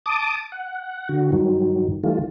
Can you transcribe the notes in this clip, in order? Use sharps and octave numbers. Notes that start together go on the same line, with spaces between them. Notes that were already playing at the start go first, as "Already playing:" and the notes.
A5 D6 D#6
F#5
D3 F#4
G2 D#3 F#3
D#3 E3 G3 A3 F4